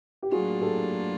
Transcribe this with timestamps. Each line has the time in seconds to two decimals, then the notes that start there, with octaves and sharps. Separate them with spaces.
0.23 G4
0.31 A2 F#3 A#3 D4 F4 F#4 G#4
0.61 G4 A4